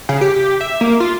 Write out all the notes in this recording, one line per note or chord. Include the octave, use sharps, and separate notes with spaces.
C#3
G4
E5
A#3
F4